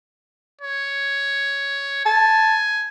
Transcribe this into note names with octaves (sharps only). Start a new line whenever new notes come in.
C#5
G#5 A5